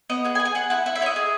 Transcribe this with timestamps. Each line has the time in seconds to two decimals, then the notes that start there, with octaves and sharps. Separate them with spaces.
0.10 B3 D#5
0.24 G#4 F#5
0.35 G#5
0.40 G#4
0.45 G#5
0.55 G#4 F#5
0.70 E4 F#5
0.86 E4 F#5
0.95 E5
1.01 E4 C#5
1.06 D#5
1.16 G#4